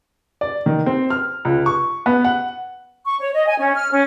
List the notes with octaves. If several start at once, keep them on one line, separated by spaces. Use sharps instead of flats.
D5
D#3
C4
F6
C#2
C#6
B3
F#5
C#6
C#5
D#5
G#5
C#4
F6
C#4